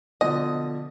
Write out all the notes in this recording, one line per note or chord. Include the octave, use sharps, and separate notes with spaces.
B2 D3 F3 D#5